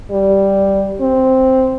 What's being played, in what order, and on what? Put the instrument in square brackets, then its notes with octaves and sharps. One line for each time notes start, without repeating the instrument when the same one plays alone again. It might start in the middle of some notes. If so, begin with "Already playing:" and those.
[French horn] G3
C4